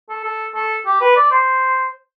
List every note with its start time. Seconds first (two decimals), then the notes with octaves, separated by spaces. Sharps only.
0.09 A4
0.24 A4
0.55 A4
0.86 G4
1.01 B4
1.16 D5
1.32 C5